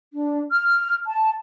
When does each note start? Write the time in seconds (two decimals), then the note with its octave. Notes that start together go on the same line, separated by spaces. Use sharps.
0.13 D4
0.51 F6
1.06 A5